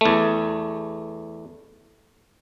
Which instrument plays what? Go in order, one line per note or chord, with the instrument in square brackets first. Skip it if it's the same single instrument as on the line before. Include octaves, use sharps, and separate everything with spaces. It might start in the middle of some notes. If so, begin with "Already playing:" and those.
[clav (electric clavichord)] E2 A3